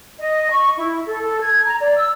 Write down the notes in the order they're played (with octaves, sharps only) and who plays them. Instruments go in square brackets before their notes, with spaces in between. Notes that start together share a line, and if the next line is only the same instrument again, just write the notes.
[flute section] D#5
C#6
E4
A4
A4
G#6
A#5
D5
E6